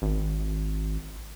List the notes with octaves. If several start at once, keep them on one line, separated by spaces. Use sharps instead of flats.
G#1